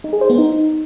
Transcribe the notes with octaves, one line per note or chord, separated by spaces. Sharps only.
D#4
G#4
C5
B3
D#4